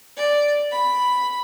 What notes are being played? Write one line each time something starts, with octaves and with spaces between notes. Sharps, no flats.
D5
B5